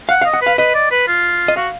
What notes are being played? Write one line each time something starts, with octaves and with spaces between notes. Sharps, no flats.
F5 F#5
F5
D#5
F#5
B4 F5
B4 D#5
D5
B4
F4
D#5
F#4 F5